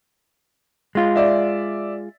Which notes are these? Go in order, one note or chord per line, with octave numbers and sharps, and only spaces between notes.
G#3 F4
D5 E5